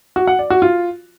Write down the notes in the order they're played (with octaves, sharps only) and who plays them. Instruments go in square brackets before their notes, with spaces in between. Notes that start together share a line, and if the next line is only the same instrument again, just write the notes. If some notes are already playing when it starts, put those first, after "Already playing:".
[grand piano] F#4
F#5
D5
F#4
F4